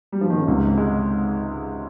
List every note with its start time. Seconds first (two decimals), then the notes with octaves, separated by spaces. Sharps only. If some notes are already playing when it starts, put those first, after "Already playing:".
0.12 G3
0.21 F3
0.30 D#3
0.39 C#3
0.47 C#2 G#2 C3
0.77 G#3